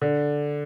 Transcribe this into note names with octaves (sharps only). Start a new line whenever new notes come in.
D3